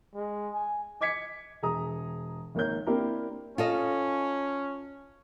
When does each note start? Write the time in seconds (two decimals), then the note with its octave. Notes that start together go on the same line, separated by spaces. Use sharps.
0.15 G#3
0.54 G#5
1.01 D#5 D6 G#6 B6 C#7
1.62 E1 G#4 A#5 D#6
2.55 G#1 D#3 A#3 C#5 G6
2.87 A#3 C4 D4 E4 G4 A#4
3.58 C#4 F4 A4 D#5